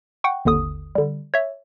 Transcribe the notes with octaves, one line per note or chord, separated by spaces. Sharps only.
F#5 G5 C#6
G#1 D#2 D3 D#6
D3 G3
C#5 E5